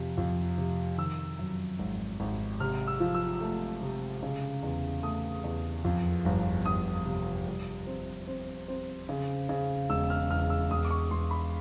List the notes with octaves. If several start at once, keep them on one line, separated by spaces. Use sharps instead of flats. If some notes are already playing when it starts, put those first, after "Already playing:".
Already playing: F2 C3
F2
C3
D#3 E6
F#2
G#1
G#1
C3 F6
E6
F3
E6
A3
C3
C#3
E2
A3 D#6
E2
F2
G1
G1 D#6
C3
G3
C4
C4
C4
C#3
C#3
E1 E6
F6
E2 F6
E6
E1 D#6
D6
C#6
E1 C6
B5